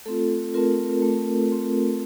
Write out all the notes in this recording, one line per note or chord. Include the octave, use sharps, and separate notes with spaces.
A3 C4 F4 A4
A3 C4 F4 A#4
A3 C4 F4
A3 C4 F4